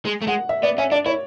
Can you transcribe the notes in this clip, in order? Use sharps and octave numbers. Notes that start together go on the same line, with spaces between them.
G#3
A3
G#3 F#5
E5
B3 D5
C#4 E5
D4 D5
E4 C#5